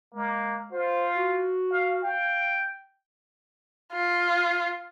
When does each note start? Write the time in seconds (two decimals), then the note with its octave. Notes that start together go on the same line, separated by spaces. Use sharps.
0.14 G#3 A#3
0.72 F4 C5
1.16 F#4
1.71 F5
2.03 F5 G5
3.93 F4